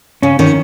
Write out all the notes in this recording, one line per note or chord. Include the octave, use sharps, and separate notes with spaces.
C#3 C#4
D#3 C#4